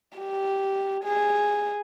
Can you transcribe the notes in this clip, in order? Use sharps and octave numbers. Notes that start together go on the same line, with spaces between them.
G4
G#4